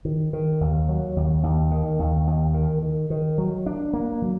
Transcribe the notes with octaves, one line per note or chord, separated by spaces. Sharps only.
D#3
D#3
D#2
F#3
D#2
D#2
D#3
D#2
D#2
D#3
D#3
D#3
F#3
D4
A#3
F#3